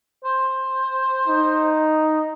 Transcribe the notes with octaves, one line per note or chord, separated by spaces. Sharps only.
C5
D#4